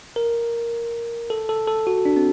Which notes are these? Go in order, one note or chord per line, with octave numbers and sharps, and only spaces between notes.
A#4
A4
A4
A4
F#4
D4
C4